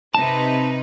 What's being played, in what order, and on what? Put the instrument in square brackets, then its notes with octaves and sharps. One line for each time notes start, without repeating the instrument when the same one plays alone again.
[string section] C3 D#4 B4 [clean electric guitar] A5